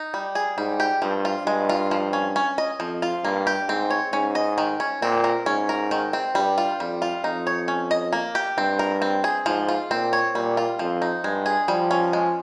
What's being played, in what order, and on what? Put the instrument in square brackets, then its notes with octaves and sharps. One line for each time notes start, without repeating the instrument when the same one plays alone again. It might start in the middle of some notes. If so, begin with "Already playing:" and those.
Already playing: [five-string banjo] D#4
G3
G#4
[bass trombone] G#2 [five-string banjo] G3
[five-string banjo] G4
[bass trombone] G2 [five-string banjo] F3
[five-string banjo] F4
[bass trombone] G2 [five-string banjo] G#3
[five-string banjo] F4
F3
C#4
C#4
D#5
[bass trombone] F2 [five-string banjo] F3
[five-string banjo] F4
[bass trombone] G2 [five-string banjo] A#3
[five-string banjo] G4
[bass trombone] G#2 [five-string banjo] C4
[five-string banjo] C#5
[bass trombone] G#2 [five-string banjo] C#4
[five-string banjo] D#5
D#3
C#4
[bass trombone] A#2 [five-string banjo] C4
[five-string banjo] A#4
[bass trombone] G#2 [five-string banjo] C#4
[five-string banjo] A#4
D#3
C4
[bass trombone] G2 [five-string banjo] G3
[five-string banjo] F4
[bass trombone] F2 [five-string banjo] G3
[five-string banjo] F4
[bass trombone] F2 [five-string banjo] D#4
[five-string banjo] C#5
C#4
D#5
A#3
G4
[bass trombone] G2 [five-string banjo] C4
[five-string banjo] A#4
C4
G#4
[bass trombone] G#2 [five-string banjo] F3
[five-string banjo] F4
[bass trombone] A#2 [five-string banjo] C4
[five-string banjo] C#5
[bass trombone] A#2 [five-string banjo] G3
[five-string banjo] F4
[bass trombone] F2 [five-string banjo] F3
[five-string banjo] D#4
[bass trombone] G2 [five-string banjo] G#3
[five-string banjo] G#4
[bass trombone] F3 [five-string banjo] G3
[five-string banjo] C#4
G#3